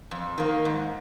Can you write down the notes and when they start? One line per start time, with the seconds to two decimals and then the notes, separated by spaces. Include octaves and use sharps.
0.11 F2
0.38 D#3 A#3
0.65 G#2